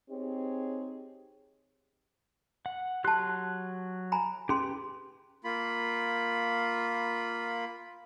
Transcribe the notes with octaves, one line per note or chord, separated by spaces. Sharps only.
C4 D#4 G4 G#4 C#5
F#5
F#3 G4 A5 C6 F#6
G#5 A#5 B5
C#4 G4 G#4 B4 C6
A#3 F4 B5